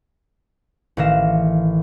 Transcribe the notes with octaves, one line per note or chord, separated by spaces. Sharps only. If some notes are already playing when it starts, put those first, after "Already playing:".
A1 D#3 E3 F5 A#6 E7